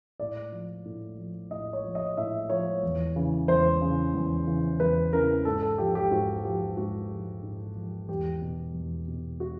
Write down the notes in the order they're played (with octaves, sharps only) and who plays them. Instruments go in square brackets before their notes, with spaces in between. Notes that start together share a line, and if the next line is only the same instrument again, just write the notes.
[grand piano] A2 D5
F3
A2
F3
A2 D#5
C#5
F3
D#5
A2 E5
F3 C#5
E2
C#3 E3
E2 C5
C#3 E3
E2
C#3 E3
E2 B4
C#3 E3 A#4
G#2 A4
A4
F3 G4
G4
G#2 F#4
F3 G4
G#2 F#4
F3
G#2
F3
E2 G4
B2
E2
B2
F#4